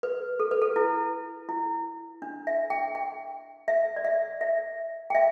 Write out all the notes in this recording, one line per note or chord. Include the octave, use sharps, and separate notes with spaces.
B4
A4
B4
A4
E4
E4
D4
E5
G5
G5
E5
D5
E5
E5
G5
E5